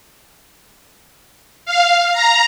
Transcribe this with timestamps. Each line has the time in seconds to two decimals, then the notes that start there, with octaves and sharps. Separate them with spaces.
1.65 F5
2.13 A#5